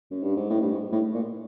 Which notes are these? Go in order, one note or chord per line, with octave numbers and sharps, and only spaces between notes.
F#2
G2
G#2
A2
G2
G#2
A2
A#2